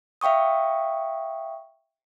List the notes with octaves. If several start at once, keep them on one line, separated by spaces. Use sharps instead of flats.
E5 F5 G5 C#6 D#6